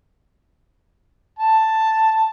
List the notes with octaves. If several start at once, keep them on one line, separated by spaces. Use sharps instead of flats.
A5